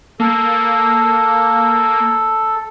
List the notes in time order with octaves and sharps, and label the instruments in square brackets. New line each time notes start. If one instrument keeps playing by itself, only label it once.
[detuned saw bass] A#3 [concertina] A4